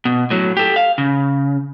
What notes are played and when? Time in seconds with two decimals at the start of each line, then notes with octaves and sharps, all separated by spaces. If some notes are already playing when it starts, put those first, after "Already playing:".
0.05 B2
0.30 A2 F#3
0.57 G4 A4
0.76 F5
0.98 C#3